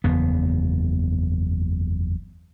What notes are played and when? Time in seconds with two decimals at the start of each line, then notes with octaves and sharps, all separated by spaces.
0.04 F#1 E2 B3